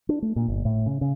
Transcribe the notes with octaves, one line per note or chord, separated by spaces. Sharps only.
D4
A3
A#2
G1
A2
C#3
C#3